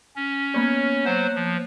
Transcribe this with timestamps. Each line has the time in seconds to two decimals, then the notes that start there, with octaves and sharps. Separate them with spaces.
0.16 C#4
0.54 A#3 B3 C#5
1.05 F#3 C5 F#5
1.35 F3